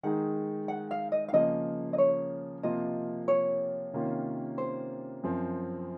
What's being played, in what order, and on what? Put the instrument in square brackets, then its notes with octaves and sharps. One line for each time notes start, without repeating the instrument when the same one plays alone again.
[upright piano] D#3 G#3 D#4 G#4 [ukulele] F#5
[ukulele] F#5
F5
D#5
F5
[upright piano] C#3 F3 A#3 [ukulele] D#5
[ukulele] D#5
C#5
[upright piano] C3 F3 A#3 F4 [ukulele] D#5
[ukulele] C#5
[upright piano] C3 D#3 A#3 C#4 F4
[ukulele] C5
[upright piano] F#2 F3 C4